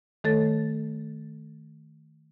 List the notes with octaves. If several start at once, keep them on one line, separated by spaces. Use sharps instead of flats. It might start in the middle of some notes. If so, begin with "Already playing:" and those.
D#3 A3 A4 C#5 A6